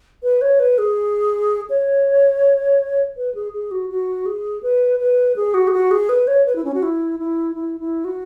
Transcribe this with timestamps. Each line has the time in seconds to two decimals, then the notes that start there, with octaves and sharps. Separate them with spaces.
0.23 B4
0.42 C#5
0.60 B4
0.78 G#4
1.70 C#5
3.17 B4
3.35 G#4
3.53 G#4
3.71 F#4
3.90 F#4
4.26 G#4
4.63 B4
5.00 B4
5.36 G#4
5.54 F#4
5.68 G#4
5.73 F#4
5.91 G#4
6.09 B4
6.27 C#5
6.46 B4
6.56 E4
6.64 C#4
6.74 F#4
6.83 E4
7.20 E4
7.56 E4
7.80 E4
8.05 F#4